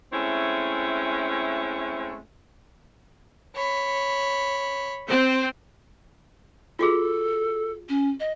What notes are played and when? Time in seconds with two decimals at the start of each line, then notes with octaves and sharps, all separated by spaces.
0.13 G#3 A3 C4 C#4 E4
3.56 C#5 B5
5.08 C4 C5
6.79 F4 F#4 G#4 A4
7.89 C#4
8.20 D#5